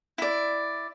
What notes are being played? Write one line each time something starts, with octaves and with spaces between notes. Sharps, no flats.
E4 D5